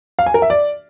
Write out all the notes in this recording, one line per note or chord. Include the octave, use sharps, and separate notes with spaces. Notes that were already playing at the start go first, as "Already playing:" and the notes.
F5
G#5
A#4
E5
D5